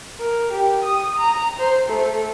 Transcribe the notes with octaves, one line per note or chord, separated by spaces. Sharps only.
A#4
G4
D#6
A#5
C5
A3